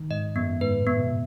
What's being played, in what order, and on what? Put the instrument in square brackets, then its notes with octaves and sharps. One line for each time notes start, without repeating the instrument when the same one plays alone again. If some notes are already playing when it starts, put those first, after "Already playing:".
Already playing: [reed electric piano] D#3
[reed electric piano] G#2 [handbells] D#5
[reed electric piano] F#2 [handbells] B3
[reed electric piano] G#2 [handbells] B4
[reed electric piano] A2
[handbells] B3
[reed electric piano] B2